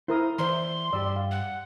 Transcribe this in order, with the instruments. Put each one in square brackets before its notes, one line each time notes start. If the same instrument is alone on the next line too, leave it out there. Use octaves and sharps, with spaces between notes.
[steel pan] E4 A#4 D#6 [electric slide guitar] C5
[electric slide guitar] E3 D5 E5 [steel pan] C5 A#5 [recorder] C6
[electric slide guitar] G2 G4 [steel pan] D5 E6
[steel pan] F5
[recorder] F#5